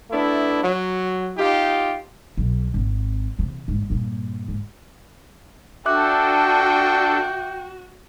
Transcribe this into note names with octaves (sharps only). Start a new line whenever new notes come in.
A3 B3 D4 E4
F#3
D#4 F4 G4
B1
G#1 C4
C3 E3
A1 G#2
G2 A#2
G#2
D4 F#4 A4 E5 G5 D6 F#6